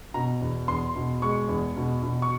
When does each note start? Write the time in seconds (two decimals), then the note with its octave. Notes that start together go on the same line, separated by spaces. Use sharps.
0.14 B2 A#5
0.41 E2
0.68 E2 C6
0.96 B2
1.22 G#3 C#6
1.49 E2
1.76 B2
2.02 B2
2.22 C#6